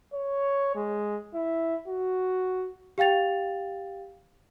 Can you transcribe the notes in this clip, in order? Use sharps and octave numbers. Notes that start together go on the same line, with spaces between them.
C#5
G#3
E4
F#4
G4 F5 G5 A6 F7